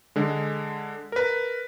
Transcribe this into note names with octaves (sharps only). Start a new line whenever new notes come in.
D3 G#3
A#4 B4